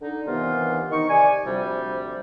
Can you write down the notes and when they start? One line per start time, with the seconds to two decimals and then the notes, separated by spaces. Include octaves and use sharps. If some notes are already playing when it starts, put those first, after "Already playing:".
0.01 D3 D#4
0.27 G2 C3 D#3 E3 B3 F4
0.91 D#3 D#4 C#6
1.09 C3 D5 G#5
1.45 D2 C3 F3 G3